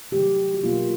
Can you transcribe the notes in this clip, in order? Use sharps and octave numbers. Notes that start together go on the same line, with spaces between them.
C3 D#3 F#3 A3 G4
F#4
B2 F#3 A#3 F4